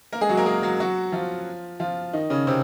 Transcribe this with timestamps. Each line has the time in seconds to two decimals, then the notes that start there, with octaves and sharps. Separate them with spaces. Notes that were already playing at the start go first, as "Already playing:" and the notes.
0.13 A#3 A#4
0.21 G#3 G#4
0.29 F#3 F#4
0.37 A#3 A#4
0.46 G#3 G#4
0.62 F#3 F#4
0.80 F#3 F#4
1.12 F3 F4
1.80 F3 F4
2.13 D#3 D#4
2.30 C#3 C#4
2.47 C3 C4